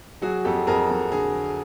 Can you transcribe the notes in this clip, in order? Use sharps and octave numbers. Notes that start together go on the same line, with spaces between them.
F#3 F#4 G#4
F2 G4 A4
F2 G#4 A#4
F2
D3 G#4